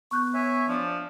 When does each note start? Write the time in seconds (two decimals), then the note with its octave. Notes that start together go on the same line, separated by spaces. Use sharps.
0.11 B3 C#6 F#6 G6
0.34 C#5 E5 G#5
0.68 F3 D4